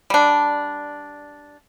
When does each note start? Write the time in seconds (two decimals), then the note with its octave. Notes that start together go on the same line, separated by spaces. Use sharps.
0.10 G3 D4